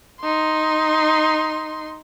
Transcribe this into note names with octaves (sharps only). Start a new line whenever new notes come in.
D#4 C6